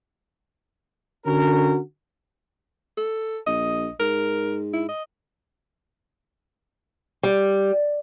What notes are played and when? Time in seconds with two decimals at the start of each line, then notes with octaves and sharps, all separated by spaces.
1.25 D3 C#4 F#4 A#4
2.97 A4
3.47 A#1 D#5
4.00 G#2 A#4
4.73 E4
4.89 D#5
7.23 G3